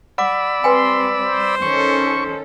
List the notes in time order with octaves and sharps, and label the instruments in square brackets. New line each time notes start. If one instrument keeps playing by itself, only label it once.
[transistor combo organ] D5 B5 E6 [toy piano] F#5 D6
[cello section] G3 C4 [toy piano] B4 G5 G#5 [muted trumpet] C6
[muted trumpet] C5
[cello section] D#3 C#4 A4 [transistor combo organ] C#6